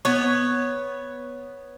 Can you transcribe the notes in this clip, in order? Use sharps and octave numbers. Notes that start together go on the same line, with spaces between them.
B3 C#5